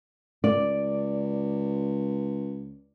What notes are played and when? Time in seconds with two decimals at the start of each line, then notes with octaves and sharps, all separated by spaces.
0.44 C#2 D5